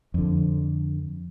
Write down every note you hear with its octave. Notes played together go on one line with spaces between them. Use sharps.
F2 D3